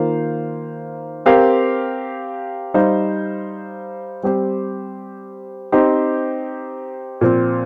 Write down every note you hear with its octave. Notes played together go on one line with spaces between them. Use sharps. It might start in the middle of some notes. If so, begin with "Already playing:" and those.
Already playing: D#3 A#3 F4 C5 F5
C4 G4 A#4 F5
G3 D#4 C5 F5
G3 C4 G4 C5
C4 D#4 G4 C5
A#2 F3 C4